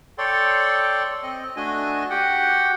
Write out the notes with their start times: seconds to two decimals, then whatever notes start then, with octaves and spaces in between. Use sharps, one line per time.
0.18 A4 C#5 D5 G5 C6
1.23 C4 D#5
1.56 A3 D4 F#4 D#5 G#5
2.10 F#4 G4 F#5 G5